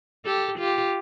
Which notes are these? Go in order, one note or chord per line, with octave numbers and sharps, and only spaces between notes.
G4 A4
F4 G4